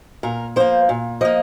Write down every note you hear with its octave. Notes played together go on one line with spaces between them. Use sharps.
A#2 A#4
F3 A#3 C5
A#2
F3 A#3 D#5